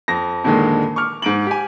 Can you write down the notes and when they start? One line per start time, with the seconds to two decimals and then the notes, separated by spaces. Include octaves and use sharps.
0.08 F2 A#6
0.44 F2 A#2 D3 D#3 G#3
0.96 C#6 D6 F6
1.22 G#2 D7 F#7
1.47 G4 G#5